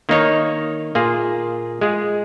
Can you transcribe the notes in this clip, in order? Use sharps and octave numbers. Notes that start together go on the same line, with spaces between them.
D#3 A#3 D#4 C#5
A#2 A#3 F4 G#4
G#3 F4 G#4